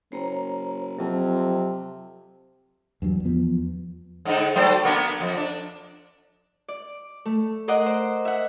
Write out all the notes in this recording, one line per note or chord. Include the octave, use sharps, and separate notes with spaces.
F#1 C5 C#5 A#5
F2 C3 F#3 C4 A5
E2 G2 F#3
E2 F3 B3
G#2 D3 D#4
F#3 A3 C5
A#3 B3 D4
F2
D4
D5
A3
A#4 D5 D#5 F#5 C6
C5
E5 F#5